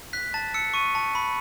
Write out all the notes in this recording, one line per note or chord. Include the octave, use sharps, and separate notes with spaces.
F#6 B6
A5 A6
E6 C#7
C#6 D#7
A5
B5